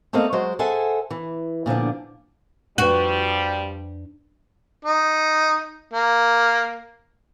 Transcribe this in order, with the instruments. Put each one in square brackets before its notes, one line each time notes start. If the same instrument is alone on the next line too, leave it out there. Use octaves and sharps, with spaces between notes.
[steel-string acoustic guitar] A3 A#3 C4 A4 D#5 F5
F#3 G#3 F#4 C5
G#4 A4 C5 E5 F#5 G#5
E3
A#2 D3 F3 D4
[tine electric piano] F2 D4 [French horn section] F3 G3 [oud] F#4 [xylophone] B4 F#7
[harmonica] D#4
A#3